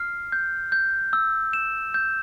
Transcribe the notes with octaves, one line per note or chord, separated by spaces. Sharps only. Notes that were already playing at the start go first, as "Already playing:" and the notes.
Already playing: F6 C7
G6
G6
E6
E7
G6